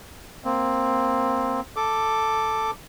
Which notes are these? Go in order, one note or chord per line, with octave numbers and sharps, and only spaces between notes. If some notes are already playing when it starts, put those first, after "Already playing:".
A#3 C4
A4 D6